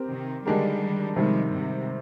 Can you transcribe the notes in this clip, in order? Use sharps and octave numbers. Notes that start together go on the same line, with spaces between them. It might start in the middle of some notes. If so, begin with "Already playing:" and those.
Already playing: C4 G4 A#4
C3 D#3
D3 D#3 G3 G#3 D4 G4 A#4
C3 D#3 F3 G3 G#3
G#2 C3